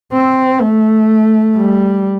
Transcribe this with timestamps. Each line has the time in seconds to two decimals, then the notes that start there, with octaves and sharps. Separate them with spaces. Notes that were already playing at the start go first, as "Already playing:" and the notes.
0.13 C4
0.61 A3
1.56 G3